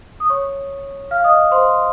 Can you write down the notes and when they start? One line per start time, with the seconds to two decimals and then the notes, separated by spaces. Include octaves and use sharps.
0.20 D#6
0.30 C#5 C#6
1.11 F5 F6
1.24 D#5 D#6
1.51 C5 C6